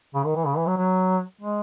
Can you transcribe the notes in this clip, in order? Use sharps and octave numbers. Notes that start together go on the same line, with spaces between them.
C#3
D#3
E3
C#3
E3
F#3
F#3
G#3